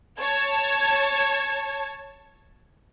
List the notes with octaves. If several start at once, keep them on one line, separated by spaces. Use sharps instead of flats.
C#5 A5 G#6